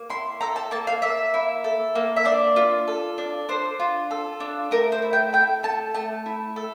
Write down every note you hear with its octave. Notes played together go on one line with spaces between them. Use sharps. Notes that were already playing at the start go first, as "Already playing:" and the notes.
Already playing: A#3
E4 C6
A4 A#5
A5
A#3 A5
F5
A#3 E5
E4
A4
A#3
E5
D4 D5
F4
A4
D4
D4 C5
F4
A4
D4
A3 A#4
C5
E4
G5
A4 G5
A3 A5
A3 A5
E4
A4